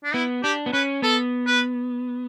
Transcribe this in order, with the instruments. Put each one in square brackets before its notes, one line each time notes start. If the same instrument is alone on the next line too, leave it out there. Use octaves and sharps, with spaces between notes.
[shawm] D4
[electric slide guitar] B3 [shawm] E4
[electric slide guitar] D4 [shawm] G4
[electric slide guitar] B3
[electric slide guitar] C#4 [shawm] B4
[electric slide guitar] B3 [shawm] A4
[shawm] B4